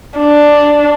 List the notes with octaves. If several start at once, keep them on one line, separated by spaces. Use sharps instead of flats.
D4